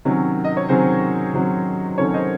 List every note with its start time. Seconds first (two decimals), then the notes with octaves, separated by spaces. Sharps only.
0.05 C3 D#3 F#3 C#4
0.44 D#5
0.57 C#5
0.69 C3 D#3 F#3 C#4 G#4 C5
1.33 C3 D#3 F#3 C#4
1.98 C3 D#3 F#3 C#4 A4 C#5
2.14 C5 D#5